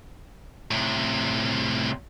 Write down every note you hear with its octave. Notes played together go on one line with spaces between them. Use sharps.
A2 C3